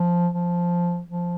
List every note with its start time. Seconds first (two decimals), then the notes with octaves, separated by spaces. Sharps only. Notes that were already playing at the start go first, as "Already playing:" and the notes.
Already playing: F3
0.34 F3
1.10 F3